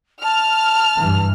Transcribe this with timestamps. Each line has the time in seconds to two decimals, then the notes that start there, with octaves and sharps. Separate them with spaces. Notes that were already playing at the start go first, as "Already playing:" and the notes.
0.23 A5 F6
0.98 G2 E3